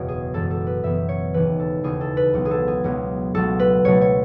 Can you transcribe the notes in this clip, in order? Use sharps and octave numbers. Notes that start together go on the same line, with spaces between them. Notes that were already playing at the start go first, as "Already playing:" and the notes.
Already playing: F#1 E2 B2 G#3 B3 C#5
G#4
F#2 E3 G#3 B3 A4
A4
B4
F#2 E3 G#3 B3 E5
C#5
E1 D#2 C#3 E3 B4
A4
E1 D#2 C#3 E3 G#4
A4
B4
C#2 B2 F#3 B3
G#4
A4
G#4
C#2 B2 F#3 B3
C#2 B2 F#3 A3 A4
B4
C#2 B2 F#3 A3 C#5
C#5